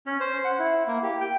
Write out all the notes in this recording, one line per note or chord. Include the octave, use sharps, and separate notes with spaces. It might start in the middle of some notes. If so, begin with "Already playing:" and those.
C#4
C5
F#5
E4
A#3
G4
G5